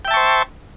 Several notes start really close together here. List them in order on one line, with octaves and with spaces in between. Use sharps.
G5 E5 A5 C#6 C5